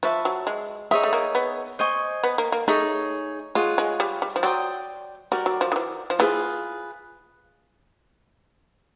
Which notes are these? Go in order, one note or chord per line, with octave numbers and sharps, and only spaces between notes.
F3 B4 E5 A5 C#6
F#3
G#3
G#3 D#4 G#4 C#5 E5
A3
A#3
B3
C5 D#5 G#5 C#6
B3
A#3
A#3
A3 D#4 G#4 C#5
G#3 F4 G#4 C#5 F#5
G#3
G3
G3
F3
F#3 D5 G5 C6 D#6
G3 F#4 A#4 D5
F#3
F3
D#3
E3
F3
E3 F4 G#4 B4